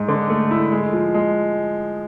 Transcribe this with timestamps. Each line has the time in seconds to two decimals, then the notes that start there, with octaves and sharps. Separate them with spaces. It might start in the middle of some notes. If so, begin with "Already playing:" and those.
Already playing: G#2
0.08 D3
0.30 A3
0.51 E4
0.72 G#3
0.93 F3
1.14 G#3